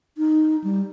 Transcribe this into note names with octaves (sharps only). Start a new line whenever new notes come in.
D#4
G3